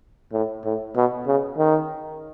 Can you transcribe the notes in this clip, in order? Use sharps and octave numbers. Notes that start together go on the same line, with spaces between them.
A2
A2
B2
C#3
D#3